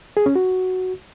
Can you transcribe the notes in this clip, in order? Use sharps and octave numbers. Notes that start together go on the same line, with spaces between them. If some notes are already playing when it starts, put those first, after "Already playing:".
G#4
C#4
F#4